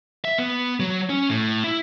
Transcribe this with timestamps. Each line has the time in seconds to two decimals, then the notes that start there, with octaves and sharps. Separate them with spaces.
0.25 E5
0.38 B3
0.80 F#3
1.09 C#4
1.29 A2
1.64 E4